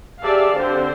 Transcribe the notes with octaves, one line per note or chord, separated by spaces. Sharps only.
G4 G#4 D5 E5 F5 A5
D3 C4 G4 C5